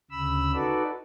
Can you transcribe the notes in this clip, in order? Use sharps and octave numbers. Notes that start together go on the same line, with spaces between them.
D2 C#3 B5 E6
D#4 F#4 A4 B4 D5